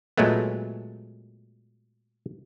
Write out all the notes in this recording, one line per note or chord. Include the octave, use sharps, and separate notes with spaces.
A#2 F#3 G#3 A3 B3